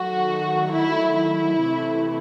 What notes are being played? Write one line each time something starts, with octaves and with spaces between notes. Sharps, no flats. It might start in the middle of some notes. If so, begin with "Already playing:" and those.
Already playing: D#3 F#3 A3 F#4
E4
E4
C3 E3 A3